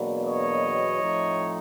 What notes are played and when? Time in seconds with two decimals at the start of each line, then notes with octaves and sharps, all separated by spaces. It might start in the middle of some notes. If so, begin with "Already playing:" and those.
Already playing: E2 B2 F#3 A#3 D4
0.24 C#5 D#5
0.99 A2 F3 A3 C4 D#4